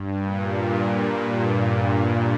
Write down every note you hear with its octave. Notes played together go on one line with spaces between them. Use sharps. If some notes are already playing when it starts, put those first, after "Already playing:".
Already playing: G2
A#2